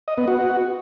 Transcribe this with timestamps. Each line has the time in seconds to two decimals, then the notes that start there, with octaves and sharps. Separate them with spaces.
0.08 D#5
0.18 B3
0.28 F#4